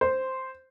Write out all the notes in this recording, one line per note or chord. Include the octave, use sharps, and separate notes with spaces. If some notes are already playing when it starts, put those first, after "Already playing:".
C5